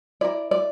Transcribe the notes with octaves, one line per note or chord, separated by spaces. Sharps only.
E4 A#4 D5
D5